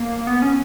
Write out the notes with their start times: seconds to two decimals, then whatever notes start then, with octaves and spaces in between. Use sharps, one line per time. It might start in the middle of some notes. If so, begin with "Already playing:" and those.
Already playing: A#3
0.27 B3
0.42 C#4